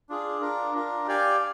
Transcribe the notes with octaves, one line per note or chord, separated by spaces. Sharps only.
D4 F4 G#4
D4 F4 A#4
D4 F4 A#4
G4 D5 F5 G#5